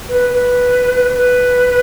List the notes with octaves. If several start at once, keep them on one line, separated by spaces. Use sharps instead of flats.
B4
B4
B4